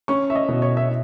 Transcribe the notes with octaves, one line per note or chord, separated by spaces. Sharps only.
C#4 C#6
E5
D#5
B2
C#5
E5